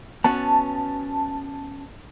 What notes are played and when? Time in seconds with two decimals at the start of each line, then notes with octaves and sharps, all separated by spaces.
0.24 B3 C#4 F#4 A5